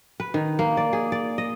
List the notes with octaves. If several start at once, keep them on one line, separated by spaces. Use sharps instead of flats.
B4
D#3
A#3
D5
G#4
D5
D#5